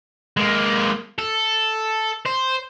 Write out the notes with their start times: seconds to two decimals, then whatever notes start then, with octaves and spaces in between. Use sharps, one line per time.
0.37 G#3 A#3
1.19 A4
2.26 C5